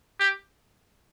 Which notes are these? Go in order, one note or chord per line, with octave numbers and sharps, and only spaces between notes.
G4